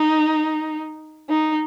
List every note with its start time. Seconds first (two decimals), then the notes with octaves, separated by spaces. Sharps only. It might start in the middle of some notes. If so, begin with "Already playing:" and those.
Already playing: D#4
1.29 D#4